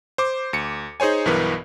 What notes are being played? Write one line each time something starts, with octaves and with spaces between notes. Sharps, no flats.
C5 D6
D2 C#7
D#4 G#4 C5 C#5 G#5
B1 G2 E3 B3 A#4 B4